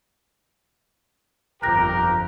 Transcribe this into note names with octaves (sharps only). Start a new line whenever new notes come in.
G1 F2 G4 A#4 A#5 F#6 A#6